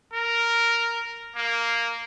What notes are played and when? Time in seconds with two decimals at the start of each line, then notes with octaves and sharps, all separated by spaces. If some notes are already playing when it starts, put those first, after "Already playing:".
0.14 A#4
1.36 A#3